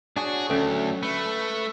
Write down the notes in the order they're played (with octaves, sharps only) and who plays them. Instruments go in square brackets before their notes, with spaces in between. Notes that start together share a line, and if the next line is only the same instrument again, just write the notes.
[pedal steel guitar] D4 F#4 C#5 [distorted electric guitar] G#4
[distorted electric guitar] D2 [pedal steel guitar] F#3 A3 [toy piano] C#4 A4
[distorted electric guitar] A3 [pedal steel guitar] B4